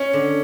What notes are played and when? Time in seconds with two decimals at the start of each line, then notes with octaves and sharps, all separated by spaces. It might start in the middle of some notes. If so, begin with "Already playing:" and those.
Already playing: C#4
0.13 D3